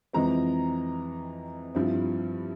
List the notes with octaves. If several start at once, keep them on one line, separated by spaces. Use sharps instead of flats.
F2 E3 G#3 C4 A#5
G2 F3 C4 E4